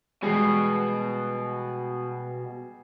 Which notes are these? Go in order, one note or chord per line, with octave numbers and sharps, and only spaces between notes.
B2 E3 G3 G#3 G#4 C7